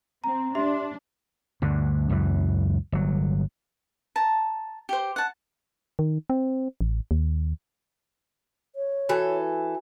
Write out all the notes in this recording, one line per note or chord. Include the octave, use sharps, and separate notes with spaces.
C4 A#5
D4 G4 E5 C6
D2 G2 D3
C#2 F#2 E3
G1 F#3
A5 A#5
G4 C5
F#5 A5
D#3
C4
A1
D#2
C#5
E3 F#4 A4